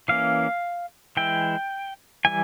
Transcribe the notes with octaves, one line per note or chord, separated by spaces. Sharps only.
E3 A#3 C#4 F5
E3 G#3 E4 G5
E3 G3 G#5